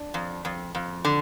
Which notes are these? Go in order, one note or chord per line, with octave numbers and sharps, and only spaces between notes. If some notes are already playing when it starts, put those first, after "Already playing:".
Already playing: D4
F2
F2
F2
D3